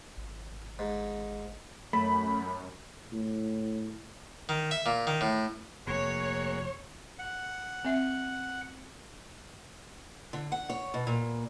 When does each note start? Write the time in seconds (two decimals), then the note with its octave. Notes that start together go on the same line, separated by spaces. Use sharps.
0.17 G#1
0.79 G#2
1.93 F#2 A3 B5
3.12 A2
4.49 D#3
4.71 E5
4.86 A#2
5.07 D#3
5.21 A2
5.87 F1 A#3 F#4 G#4 C#5
7.19 F#5
7.85 C4 E5
10.33 D3
10.52 F#5
10.70 C#5
10.94 B2
11.07 A#2